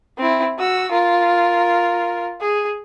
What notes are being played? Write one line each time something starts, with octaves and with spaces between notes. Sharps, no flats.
C4 E4
F#4 E6
F4 A#4
G#4